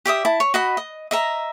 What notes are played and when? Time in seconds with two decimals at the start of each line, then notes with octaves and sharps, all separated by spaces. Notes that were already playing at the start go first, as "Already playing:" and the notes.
0.05 G4 D5 E5 D#6
0.25 E4 A5
0.40 C#5
0.54 F#4 D#5 B5
0.77 D#5
1.11 D#5 E5 A#5